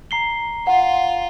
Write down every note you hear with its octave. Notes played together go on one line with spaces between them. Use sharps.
A#5 C7 G7
F4 F#5